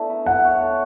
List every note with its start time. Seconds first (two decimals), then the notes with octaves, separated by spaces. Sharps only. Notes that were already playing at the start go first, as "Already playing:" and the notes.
Already playing: A3 B3 D4 E4
0.10 B4
0.26 E4 F#5
0.44 C#5
0.61 A4